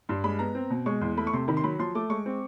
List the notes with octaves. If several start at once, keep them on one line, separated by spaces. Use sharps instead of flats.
G2 C6
G#3 B5
B3 A#5
C4
B2
G#3 C#6
E2 C6
A3 B5
C#6
C3 C6
D#3 B5
C6
F#3 B5
F3 C6
A3 D6
G#3 C#6
C4